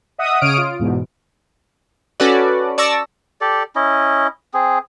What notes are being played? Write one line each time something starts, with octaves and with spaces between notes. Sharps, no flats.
D#5 E5 F#5 D#6
C#3 C#5 D#6 F6 D7
F4
E2 G#2 B2
C#4 F#4 A4 B4 D5
D5 A5 C#6 E6 A#6
G4 A4 D5
C#4 E4 D#5
C4 G#4